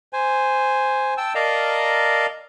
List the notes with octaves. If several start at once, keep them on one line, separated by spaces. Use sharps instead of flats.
C5 G#5
G5 A5 E6
A#4 D5 D#5 F5 A5 A#5